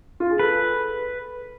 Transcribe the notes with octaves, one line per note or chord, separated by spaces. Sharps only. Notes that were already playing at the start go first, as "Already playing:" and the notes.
F4
G#4
A4 B4